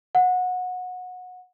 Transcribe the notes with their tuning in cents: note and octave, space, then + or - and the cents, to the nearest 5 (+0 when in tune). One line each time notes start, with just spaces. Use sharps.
F#5 -20